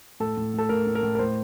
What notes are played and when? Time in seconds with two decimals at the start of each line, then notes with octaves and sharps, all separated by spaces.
0.20 A2 A4
0.37 A2
0.54 A2 A4
0.69 A2 A#4
0.87 A2
0.95 A#4
1.03 A2
1.15 A#4
1.19 A2 C5